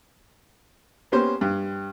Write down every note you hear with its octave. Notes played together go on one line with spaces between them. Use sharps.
A#3 B3 C#4 G4 C5
G2 G4